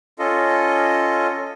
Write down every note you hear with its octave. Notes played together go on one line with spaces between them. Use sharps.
C#4 F4 A4 D#5